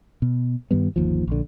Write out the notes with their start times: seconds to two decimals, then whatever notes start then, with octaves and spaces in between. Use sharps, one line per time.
0.22 B2
0.71 G2 D#3 G3 B3
0.96 G1 D#2 F3
1.27 A#1 D3